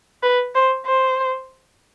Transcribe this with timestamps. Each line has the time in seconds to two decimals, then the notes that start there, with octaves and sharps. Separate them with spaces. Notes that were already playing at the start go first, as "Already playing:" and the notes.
0.23 B4
0.55 C5
0.86 C5